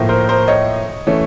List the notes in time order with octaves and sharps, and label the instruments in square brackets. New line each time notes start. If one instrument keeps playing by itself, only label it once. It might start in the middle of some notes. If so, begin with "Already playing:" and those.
Already playing: [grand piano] A2 F3 A#3
A#4 C5
A#4 C5
C#5 D#5
E3 A3 C#4